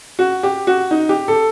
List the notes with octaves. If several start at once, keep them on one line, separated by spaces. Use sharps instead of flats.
F#4
G4
F#4
D#4
G4
A4